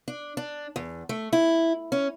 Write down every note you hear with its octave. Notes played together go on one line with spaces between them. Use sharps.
D4
D4
E2
A3
E4
C#4